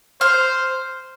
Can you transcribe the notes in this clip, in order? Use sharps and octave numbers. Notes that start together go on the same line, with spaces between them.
C5 F6